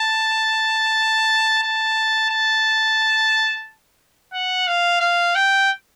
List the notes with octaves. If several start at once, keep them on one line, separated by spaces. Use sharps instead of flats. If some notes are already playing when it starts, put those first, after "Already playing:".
Already playing: A5
A5
A5
F#5
F5
F5
G5